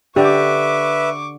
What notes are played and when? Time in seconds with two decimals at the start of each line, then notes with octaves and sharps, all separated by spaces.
0.16 D3 G4 B4 E5 C#6 D6